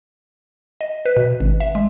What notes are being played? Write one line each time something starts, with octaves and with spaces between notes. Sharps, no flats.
D#5
B4
B2
G#1
E5
G#3